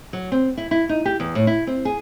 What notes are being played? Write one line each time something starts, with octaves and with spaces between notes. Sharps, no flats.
F#3
C4
E4
E4
D#4
G4
E2
A2
E4
C4
G#4